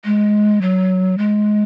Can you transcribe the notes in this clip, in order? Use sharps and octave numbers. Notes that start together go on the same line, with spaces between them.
G#3
F#3
G#3